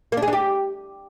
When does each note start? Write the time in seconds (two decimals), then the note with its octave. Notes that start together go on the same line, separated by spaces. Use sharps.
0.12 A#3
0.17 D4
0.22 G#4
0.28 D4
0.33 G4